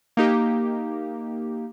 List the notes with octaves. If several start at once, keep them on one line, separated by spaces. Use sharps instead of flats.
A#3 D#4 G4